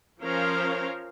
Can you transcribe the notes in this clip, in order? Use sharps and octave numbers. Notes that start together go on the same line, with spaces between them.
F3 C#4 A#4 C5 C#5 F5